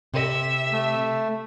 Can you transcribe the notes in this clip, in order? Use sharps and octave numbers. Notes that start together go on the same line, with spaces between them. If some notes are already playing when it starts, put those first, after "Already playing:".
C3 E5
A3